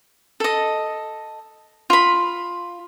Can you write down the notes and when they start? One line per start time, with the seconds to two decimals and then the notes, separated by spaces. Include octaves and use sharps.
0.40 A4 D#5
1.90 F4 B5